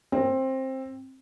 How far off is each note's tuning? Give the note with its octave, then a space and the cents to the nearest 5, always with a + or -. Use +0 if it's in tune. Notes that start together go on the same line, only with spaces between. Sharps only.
C4 +15